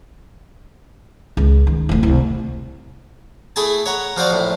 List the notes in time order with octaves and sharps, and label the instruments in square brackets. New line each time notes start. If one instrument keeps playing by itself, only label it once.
[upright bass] C#2
D#3
E1 D2
C2
[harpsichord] A3 E4 G#4 G#5 A5
C#5 F#5 A#5
F3 F#4 C5 D5 F5
A#1 A2